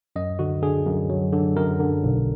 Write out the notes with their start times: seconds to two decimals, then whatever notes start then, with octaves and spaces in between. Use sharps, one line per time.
0.16 F#2 D#5
0.39 D3 F#4
0.62 D3 G#4
0.86 F#2
1.10 F#3
1.32 D3
1.56 F#2 A#4
1.80 D3
2.03 B1